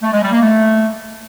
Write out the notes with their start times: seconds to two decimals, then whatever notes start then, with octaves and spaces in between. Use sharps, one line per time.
0.02 A3
0.12 G#3
0.22 G3
0.32 A#3
0.42 A3